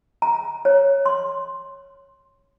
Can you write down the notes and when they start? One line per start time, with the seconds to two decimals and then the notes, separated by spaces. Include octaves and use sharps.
0.22 A#5
0.65 C#5
1.06 C6